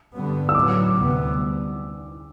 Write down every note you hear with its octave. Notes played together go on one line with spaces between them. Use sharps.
G2 D3 G3 B3
E6
A2 F#3 B3 D6
D2 C3 G3 B3